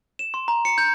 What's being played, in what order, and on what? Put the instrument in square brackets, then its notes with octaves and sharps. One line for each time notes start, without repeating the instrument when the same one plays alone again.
[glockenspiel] E7
C6
A#5
C#7
G6